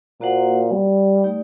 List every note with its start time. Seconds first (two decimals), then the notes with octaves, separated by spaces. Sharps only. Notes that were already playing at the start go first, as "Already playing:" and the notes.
0.21 A#2 A#3 F#4 C5 F#5
0.72 G3
1.24 A3 D#4 G4 D5